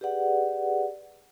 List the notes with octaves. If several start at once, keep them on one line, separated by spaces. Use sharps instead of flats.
G4 G#4 B4 D5 F#5